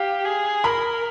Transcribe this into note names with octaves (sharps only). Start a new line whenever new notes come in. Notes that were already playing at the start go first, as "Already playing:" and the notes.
Already playing: G4 F5
G#4
A#4 B5